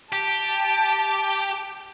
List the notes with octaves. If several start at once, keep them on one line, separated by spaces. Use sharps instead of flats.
G4 A5